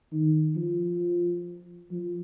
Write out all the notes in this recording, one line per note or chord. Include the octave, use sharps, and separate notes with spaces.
D#3
F3
F3